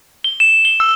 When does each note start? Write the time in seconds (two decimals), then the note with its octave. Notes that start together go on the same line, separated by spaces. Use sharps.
0.24 G7
0.40 E7
0.65 G7
0.80 E6